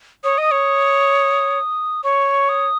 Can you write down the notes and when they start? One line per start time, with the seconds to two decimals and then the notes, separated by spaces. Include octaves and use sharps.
0.24 C#5 D#6
0.38 D#5
0.51 C#5
2.04 C#5 C#6
2.49 D#6